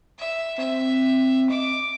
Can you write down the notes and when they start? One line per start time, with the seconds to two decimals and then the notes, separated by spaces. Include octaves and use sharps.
0.19 E5
0.58 C4 E5
1.50 D#5 D6